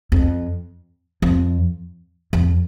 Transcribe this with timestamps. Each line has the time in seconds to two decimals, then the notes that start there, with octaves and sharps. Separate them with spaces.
0.12 F2
1.22 F2
2.33 F2